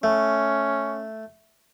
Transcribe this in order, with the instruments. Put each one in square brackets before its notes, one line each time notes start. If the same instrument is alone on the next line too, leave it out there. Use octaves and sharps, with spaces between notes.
[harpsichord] A3 [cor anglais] C#4